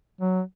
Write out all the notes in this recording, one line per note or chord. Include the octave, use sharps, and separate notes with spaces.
F#3